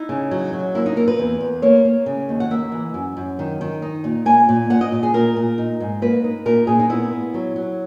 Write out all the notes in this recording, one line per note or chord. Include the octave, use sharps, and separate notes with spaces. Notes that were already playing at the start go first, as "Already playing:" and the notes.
Already playing: D#4 E4
C#3
F#3
F#3
A#3 E4
D#4
A#3 A#4
B4
E2
E2
A#3 C#5
A#3
C#3
D#2
F#5
A#3 E5
E3
F#2
F#2
D#3
D#3
D#4
A#2
A#3 G#5
A#2
A#2 F#5
D#5
A#2
G#4
A#2 A#4
A#2
D#4
G#2
A#3 B4
D#4
A#2 A#4
A#2 G#4
D#4
B3 E4
B3
F#3
F#3